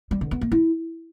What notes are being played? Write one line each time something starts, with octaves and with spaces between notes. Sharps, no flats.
G3
D3
B3
A#3
E4